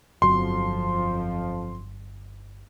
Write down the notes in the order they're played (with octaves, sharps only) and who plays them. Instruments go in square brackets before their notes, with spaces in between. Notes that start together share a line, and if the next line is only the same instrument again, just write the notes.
[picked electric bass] G1 F#3 [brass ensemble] F2 F3 [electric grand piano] C6